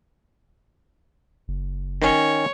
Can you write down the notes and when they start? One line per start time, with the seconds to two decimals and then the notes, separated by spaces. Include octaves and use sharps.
1.48 F#1
2.02 D#3 C#4 C#5